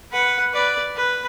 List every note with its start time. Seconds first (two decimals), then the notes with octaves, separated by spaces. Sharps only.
0.11 B4 F#5
0.52 B4 D5
0.95 B4